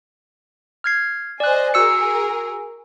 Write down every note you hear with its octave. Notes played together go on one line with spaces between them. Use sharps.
F6 G#6 C7
C5 D5 D#5 G#5 F#6
F#4 G#4 A#4 E6 C#7